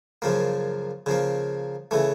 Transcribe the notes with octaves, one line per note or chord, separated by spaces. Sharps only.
F#2 C#3 F3 A#3
C#3 F3 A#3
C#3 E3 A3